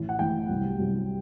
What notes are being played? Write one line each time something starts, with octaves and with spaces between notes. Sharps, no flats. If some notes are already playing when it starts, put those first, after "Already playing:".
Already playing: A1 A2 E3
F#5
A1 A2 E3 G5
C2 C3 F#3
C2 C3 F#3